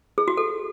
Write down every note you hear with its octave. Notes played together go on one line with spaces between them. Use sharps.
G#4
F#4
A4